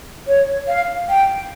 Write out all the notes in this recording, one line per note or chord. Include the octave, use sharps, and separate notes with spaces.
C#5
F5
G5